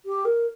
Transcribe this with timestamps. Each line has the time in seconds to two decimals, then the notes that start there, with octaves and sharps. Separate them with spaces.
0.06 G4
0.25 A#4